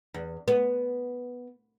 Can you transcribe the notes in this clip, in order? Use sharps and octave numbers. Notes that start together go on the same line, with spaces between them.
E2
B3